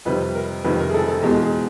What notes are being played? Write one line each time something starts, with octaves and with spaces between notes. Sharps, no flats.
F2 C3 D#3 G3 B4
A#4
F2 C3 D#3 G3 B4
A#4
G#4
A4
A4
E2 B2 G#3 G4
G#4